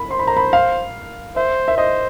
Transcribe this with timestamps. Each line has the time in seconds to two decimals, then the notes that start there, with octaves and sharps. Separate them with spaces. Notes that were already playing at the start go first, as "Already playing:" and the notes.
Already playing: B5
0.10 C5 C6
0.19 B5
0.27 A#5
0.37 B5
0.53 F5
1.36 C5 E5
1.68 E5
1.77 C5 D#5